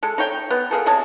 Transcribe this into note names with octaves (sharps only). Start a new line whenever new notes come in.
G#3 A4
D#4 C#5 G5
B3
A#3 G#4 A4
C3 C#5 D#5 A5